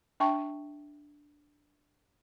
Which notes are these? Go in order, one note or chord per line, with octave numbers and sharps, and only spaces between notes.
D4 E5 G5 A5 C#6